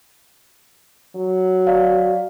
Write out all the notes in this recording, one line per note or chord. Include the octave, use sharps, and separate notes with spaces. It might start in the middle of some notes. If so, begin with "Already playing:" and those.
F#3
D5 F5